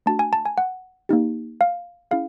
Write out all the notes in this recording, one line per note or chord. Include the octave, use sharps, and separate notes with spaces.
A3 D4 F#4 A5
G#5
A5
G#5
F#5
A#3 D#4 G4
F5
C#4 E4 G#4 F5